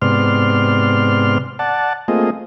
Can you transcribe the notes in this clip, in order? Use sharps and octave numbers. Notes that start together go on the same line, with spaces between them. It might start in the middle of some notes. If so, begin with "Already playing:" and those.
G#2 C3 B3 D5 C6 F6
D5 F#5 A5
A3 A#3 C4 F4 G#4 D#5